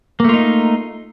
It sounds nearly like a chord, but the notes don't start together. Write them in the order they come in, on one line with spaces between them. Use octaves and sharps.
A#3 A3 F4 D#4